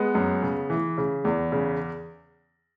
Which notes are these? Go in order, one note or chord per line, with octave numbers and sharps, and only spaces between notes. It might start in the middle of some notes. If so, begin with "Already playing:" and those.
Already playing: G#3 B3
F#2
C#3
E3
C#3
E2
C#3